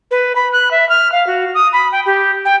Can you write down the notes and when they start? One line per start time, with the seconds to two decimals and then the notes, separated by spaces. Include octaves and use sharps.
0.11 B4
0.35 B5
0.52 F#6
0.71 E5
0.89 F6
1.12 F5
1.27 F#4
1.54 D#6
1.73 B5
1.92 G5
2.06 G4
2.45 G5